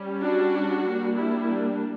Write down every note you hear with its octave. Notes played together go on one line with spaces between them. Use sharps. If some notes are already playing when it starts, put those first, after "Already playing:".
Already playing: G3 C#4
D4 F#4
G3 A#3 D4
E4
D4